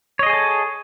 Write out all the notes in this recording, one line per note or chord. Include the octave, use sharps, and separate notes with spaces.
G#4 A4 C#5 D#5 G#5